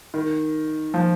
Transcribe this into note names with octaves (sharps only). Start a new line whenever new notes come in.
D#3
F3